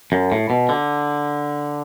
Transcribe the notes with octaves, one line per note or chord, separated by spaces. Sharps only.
F#2
A2
B2
D3